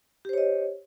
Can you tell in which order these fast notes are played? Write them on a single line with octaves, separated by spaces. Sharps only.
G4 C5 C#5 D#5